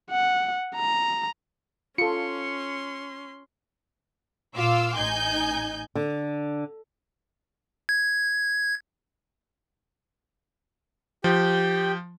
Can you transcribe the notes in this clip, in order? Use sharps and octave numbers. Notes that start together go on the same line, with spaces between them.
F#5
A#5
C#4 F4 A4 C6 C#7
A#2 F4 F5 C6 D6 E6
A1 D#4 G#5 G6
D3
G#6
F3 G4 G5